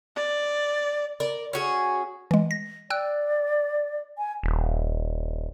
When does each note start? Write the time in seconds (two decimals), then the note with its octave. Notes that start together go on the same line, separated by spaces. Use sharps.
0.16 D5
1.20 A#4 D5
1.53 C#4 F#4 G#4
2.31 E3 G#3
2.51 A#6
2.90 D5 G5 E6 F#6
4.18 G#5
4.43 D#1